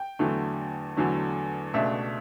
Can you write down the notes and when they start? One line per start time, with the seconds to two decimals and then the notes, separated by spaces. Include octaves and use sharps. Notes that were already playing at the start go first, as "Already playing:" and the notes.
Already playing: G5
0.19 E2 D3 F#3 A3
0.97 E2 D3 F#3 A3
1.74 C#2 B2 A3 D4 E5